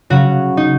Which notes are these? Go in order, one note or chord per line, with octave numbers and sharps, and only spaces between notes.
C#3 F#3 C#4 F#4
D#4